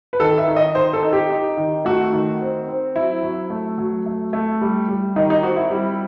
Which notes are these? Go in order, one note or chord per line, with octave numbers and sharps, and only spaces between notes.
B4
D#3 A4
E5
D#3
D#5
D#3 C5
A4
D#4
G4
D#4
D#3
A3 F#4
D#3
C4
C4
F#3 E4
F#3
A3
F#3
A3
A3
G3
G3
D#3 D#4
D#4
C4 F#4
E4
G3